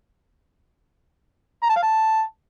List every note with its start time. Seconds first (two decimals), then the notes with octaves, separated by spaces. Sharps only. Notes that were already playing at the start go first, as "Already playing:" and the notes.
1.62 A#5
1.69 A5
1.76 F5
1.83 A5